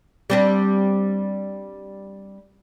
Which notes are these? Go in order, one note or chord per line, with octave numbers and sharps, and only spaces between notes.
G3 C4 D4